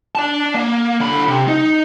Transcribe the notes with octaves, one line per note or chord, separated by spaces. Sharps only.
D5 A5
A#3
D3 B5
C3
D#4